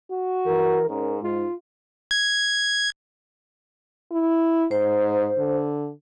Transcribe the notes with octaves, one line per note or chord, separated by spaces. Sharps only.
F#4
E3 A#4
G#2 C#4 A#4
G#2 F4
G#6
E4
G#2 C5
D3